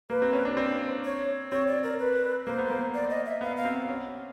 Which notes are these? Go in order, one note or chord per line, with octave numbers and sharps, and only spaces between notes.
A#3 B4
C4
C#4
D4
C4 C5
C#5
C4 C#5
D5
A#4
B4
A#3 C5
B3
A#3
D5
D#5
E5
B3 F5
F5
C4
C#4